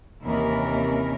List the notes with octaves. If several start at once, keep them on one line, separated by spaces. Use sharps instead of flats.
D#2 C3 E3 C#4 E4 A#4